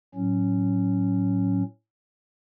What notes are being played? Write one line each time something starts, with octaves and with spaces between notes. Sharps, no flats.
A2 F#3 C#4